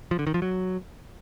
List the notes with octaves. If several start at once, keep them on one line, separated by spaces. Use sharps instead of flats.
F3
D3
D#3
F3
F#3